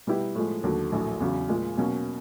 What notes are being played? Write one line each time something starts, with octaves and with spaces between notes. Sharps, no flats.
B2 G3 B3 E4 G4
A2 F3 G#3
D#2 D3 F#3
A#1 A2 F#3
E2 C#3 F#3
A#2 F3 G#3
B2 F#3 A#3 C#4